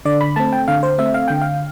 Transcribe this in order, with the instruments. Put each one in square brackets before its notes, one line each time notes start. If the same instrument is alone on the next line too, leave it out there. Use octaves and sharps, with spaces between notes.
[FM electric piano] D3 D5
B5
A3 C4 A5
G5
D3 F5
C5
A3 C4 E5
F5
D3 G5
F5